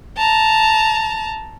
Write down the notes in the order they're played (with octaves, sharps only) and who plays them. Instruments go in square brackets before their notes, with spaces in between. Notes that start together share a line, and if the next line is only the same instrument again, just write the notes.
[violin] A5 A#5